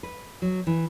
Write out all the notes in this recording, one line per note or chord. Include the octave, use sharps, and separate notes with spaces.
B4
F#3
E3